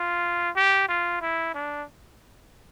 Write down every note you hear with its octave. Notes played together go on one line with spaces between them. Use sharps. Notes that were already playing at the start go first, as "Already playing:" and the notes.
Already playing: F4
G4
F4
E4
D4